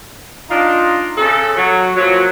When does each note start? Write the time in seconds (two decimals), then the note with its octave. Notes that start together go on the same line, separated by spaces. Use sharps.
0.50 D4 D#4 F4
1.17 C#3 A4
1.58 F#3
1.97 A#2 F3 F#3